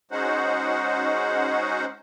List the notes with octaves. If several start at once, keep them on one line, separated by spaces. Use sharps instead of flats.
G#3 C#4 D#4 F#4 C5 F#5